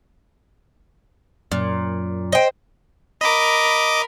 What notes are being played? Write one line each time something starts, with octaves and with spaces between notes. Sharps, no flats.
F#2 A#2
C5 D#5 G5
A#4 D#5 B5 D6